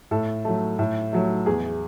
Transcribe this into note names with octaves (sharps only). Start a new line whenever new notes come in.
A2 A4
F#3 A3
A2
F#3 A3
E2 G#4